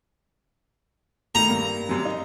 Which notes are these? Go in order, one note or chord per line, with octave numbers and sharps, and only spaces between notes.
A2 D#3 A#5
G2 A#3
F#2 C3 F#3
D#4